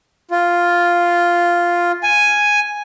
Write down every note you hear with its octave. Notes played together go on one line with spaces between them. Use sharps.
F4
G#5